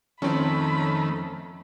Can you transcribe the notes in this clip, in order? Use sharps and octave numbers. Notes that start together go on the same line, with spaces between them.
F2 D#3 F3 A3 C4 C#4 B5